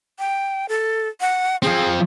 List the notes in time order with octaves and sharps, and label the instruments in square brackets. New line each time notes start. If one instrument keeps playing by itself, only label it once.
[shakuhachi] G5
A4
F#5
[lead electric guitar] F3 C4 [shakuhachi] G#4